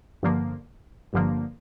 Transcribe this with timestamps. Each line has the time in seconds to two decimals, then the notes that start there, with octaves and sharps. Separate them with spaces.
0.22 G1 G2 D3 F3 A#3
1.13 G1 G2 D3 F3 A#3